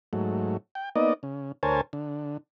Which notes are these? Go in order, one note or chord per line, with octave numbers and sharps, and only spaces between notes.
G#2 F#3 A3
G5
A#3 B3 D#4 D5 D#5
C#3
D2 A#4 C5 C#5 G#5 A5
D3